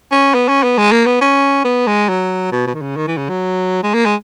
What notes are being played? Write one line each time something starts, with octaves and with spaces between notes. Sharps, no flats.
C#4
B3
C#4
B3
G#3
A#3
B3
C#4
B3
G#3
F#3
B2
B2
D#3
C#3
D#3
E3
C#3
F#3
G#3
A#3
G#3